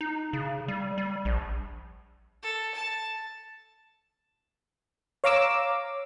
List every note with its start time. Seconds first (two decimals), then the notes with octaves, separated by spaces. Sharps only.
0.01 D#4
0.33 C#3
0.68 G3
0.98 G3
1.25 A#1
2.42 A4
2.75 A5
5.24 C#5 F5 A#5 D6 E6